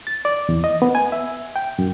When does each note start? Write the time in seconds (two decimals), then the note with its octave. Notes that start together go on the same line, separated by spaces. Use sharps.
0.07 A6
0.25 D5
0.49 E2
0.64 D#5
0.82 B3
0.95 G#5
1.12 E5
1.56 G5
1.79 F#2